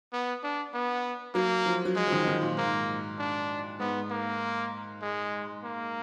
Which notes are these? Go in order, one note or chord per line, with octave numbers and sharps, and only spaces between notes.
B3
D4
B3
F#3 A#3
F3
F#3
F3 G#3
F3
D#3
D#3
A#2
G#2 A#3
D4
G#2 B3
A#3
G#3
A#3